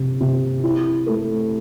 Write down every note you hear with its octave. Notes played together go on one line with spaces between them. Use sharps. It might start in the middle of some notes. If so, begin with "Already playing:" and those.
Already playing: C3
C3
E4
A3